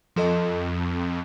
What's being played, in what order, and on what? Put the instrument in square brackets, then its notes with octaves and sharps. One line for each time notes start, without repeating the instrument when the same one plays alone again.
[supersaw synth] F2 [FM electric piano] F3 A4 D#5